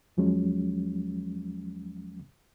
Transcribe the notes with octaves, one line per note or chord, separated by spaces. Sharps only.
E2 F3 F#3 G#3 C#4